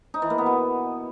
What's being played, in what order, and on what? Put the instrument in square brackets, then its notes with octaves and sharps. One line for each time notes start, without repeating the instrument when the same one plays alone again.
[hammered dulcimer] D#4
E3
A#3
B3
B2